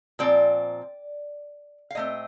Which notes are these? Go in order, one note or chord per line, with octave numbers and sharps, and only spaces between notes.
A#2 F3 C4 D5
F5
A#2 A3 C4 D#5